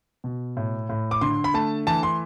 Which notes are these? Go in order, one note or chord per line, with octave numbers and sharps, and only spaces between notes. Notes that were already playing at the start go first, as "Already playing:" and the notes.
B2
A2
A2
D6
D3 C6
B5
A3 A5
E3 A5
C6